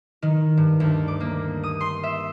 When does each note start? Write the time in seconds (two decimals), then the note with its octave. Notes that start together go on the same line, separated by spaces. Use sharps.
0.22 D#3
0.57 G2
0.80 D2
1.08 D6
1.20 A#3
1.63 D#6
1.81 C6
2.03 E5